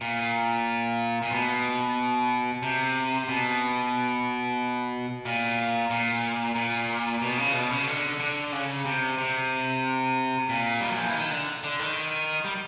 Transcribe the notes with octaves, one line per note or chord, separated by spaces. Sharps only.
A#2
A#2
B2
C3
B2
A#2
A#2
A#2
B2
C#3
B2
C#3
D3
D3
C#3
C3
C3
A#2
G3
F#3
F3
E3
D#3
D3
D3
D#3
G3